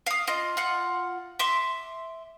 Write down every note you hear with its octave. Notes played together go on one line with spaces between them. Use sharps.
F5 D#6
F4 D#5
F4 F#5
E5 C6 D6